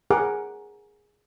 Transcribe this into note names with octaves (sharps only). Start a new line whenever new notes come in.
G#4 A#4 F#5 D6